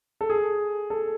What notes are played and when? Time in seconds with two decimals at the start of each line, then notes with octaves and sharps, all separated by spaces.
0.21 A4
0.30 G#4
0.90 A4